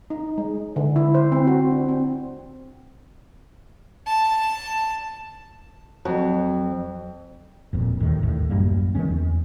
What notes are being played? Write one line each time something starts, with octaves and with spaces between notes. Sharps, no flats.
D#4
G#3
D3
E4
C5
C4
F#4
D4
C4
A5
F2 F#3
E1 F2 A#2
D#2 A2 D#3
A1 D#2 A2
F#2 G3 A#3
D#3 E3 G3 C#4
E2